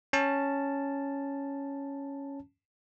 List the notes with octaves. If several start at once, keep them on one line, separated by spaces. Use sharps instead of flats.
C#4 A5